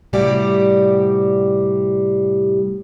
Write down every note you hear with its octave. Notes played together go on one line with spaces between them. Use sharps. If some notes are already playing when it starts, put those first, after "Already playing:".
A2 C3 G3 F#4 G4 D5